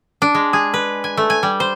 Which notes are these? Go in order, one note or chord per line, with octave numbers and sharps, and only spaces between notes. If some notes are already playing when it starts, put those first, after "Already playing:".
D4
G#3
G#4
B4
G#5
A3
G#5
G3
C5